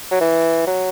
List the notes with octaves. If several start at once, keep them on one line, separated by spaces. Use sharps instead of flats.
F#3
E3
F#3